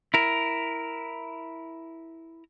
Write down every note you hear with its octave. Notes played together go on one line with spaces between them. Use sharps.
E4 A#4